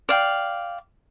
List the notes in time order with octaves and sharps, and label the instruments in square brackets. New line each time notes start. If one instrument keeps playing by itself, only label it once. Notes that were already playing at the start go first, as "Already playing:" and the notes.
[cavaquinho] D5 F5 G5